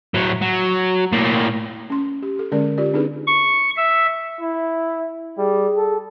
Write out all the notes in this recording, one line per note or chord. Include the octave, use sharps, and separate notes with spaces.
A2 F#3
F#3
A2 A#3
C#4 C6
G4
G4 A4
D3 G#3 C#4 G#4 A#4 D5
F4 G4 D5
C4 D4 D#4 G#4 B4
C#6
E5
E4
G3 G#4
A4